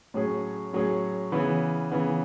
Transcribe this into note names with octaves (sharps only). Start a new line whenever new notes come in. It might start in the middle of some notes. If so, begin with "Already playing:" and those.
A2 F#3 C#4 G#4
A2 F#3 C#4 G#4
C#3 E3 B3
C#3 E3 B3